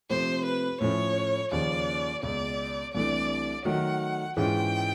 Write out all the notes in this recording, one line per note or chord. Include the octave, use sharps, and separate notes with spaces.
C3 F3 A3 C4 C5
B4
A2 F3 A3 C#4 C#5
D#2 C#3 F3 D5
C#2 B2 G#3 D5
C2 C3 E3 A3 D4 D5
D#3 F#3 A3 F#5
G#2 E3 G#3 C#4 F4 G5